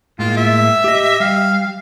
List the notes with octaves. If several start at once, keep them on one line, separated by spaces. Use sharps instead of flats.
A2 G#3 A#3 F4
E5
G4 D#5
G3 F5